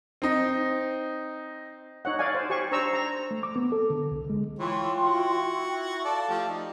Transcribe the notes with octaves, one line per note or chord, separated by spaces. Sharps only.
C4 D#4
D#4 C#5 F#5
C#5 D5 F5 G#5
C5
G4 G#5 C#6
D4 C5 A#5 C#6 E6
A#5
A3
D6
B3
A4
D3
C2
G#3
E3 F4 C#5 G5 C6
E4 F#4
A4 D5 F5 A5
F3 A3 G4
D#4